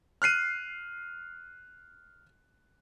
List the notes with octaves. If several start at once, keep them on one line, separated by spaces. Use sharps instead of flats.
F6 F#6 C7 D#7